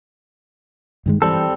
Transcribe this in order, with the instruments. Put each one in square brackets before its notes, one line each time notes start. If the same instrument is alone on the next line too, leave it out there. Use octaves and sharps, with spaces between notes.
[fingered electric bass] G2 D#3 G#3
[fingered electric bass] E3 [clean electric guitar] G3 C4 A4